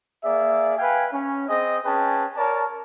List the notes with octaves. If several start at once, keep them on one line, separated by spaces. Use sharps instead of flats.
A#3 G#4 D5 E5
B4 F5 G5 G#5
C#4
C4 G#4 D#5
C#4 G#4 B4 G5 A5
A#4 C#5 D5 A5